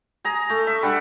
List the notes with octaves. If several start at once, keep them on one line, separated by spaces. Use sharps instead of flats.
G#4 A#5
A3
E5
G3 D4 F#5